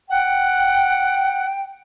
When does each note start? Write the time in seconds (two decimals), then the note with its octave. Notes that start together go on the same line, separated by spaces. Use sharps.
0.10 F#5 G5